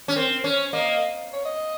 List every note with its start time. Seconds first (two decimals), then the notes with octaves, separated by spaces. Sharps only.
0.08 C#4
0.15 C4 A#4
0.44 C#4 C#5
0.73 A#3 D#5
1.33 C#5
1.45 D#5